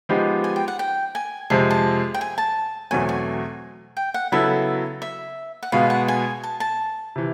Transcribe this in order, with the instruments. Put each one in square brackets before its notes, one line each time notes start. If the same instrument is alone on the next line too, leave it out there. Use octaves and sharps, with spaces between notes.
[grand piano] F3 G#3 B3 D#4 G4
[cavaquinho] G#5
G5
F#5
G5
G#5
[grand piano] F2 C3 F3 G#3 [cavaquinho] A5
[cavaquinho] A5
G5
G#5
A5
[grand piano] E2 B2 F#3 A3 C4 [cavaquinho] G#5
[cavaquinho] G#5
G5
F#5
[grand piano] C#3 F#3 B3 E4 A4 [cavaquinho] E5
[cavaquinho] E5
F#5
[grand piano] B2 G#3 B3 [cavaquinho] F5
[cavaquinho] F#5
G#5
A5
A5
[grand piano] C3 E3